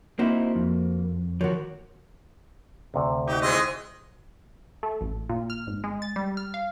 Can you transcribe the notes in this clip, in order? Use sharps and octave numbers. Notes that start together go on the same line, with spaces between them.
A#3 C4 D#4 E4 F#4 C5
F2
D#3 F3 F#4 A#4 C#5
D2 C3
D#4 F#4 G4
G#3 C4 E4 D#5
A3
A1
A#2
F6
G#1
G#3
A6
G3
F6
F5